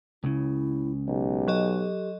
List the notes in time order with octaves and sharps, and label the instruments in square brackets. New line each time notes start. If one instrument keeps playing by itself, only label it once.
[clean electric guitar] C#2 C#3 [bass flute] E4
[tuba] B1 [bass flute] G4
[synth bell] F#3 A4 D#5